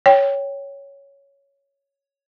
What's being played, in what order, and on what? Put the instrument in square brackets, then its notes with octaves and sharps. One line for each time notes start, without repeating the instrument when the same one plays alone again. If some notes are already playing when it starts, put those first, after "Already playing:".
[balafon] C#5 G5